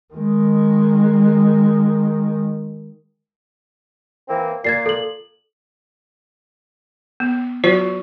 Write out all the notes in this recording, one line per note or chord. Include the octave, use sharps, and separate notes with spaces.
D#3 G#3
E3 A#3 C4
A#2 G#6 A6 C7
A4 F#7
B3
F#3 F4 F#4 C5